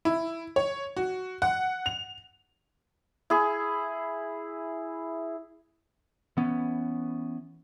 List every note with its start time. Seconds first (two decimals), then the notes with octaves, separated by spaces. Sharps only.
0.05 E4
0.56 C#5
0.97 F#4
1.42 F#5
1.86 F7
3.30 E4 G#4
6.37 E3 B3 C#4